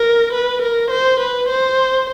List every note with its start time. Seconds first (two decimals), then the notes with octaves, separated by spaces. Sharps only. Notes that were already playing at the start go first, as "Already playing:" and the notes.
Already playing: A#4
0.33 B4
0.62 A#4
0.91 C5
1.20 B4
1.49 C5